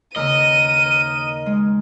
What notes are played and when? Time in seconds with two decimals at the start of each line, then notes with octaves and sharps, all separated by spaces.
0.16 D#2 C#3 A#4 D#5 E6 D#7
1.46 G#3